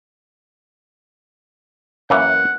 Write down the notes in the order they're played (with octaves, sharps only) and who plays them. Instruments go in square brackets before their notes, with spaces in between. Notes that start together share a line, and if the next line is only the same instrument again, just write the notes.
[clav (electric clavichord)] F#2 E3 A#3 [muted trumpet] F#5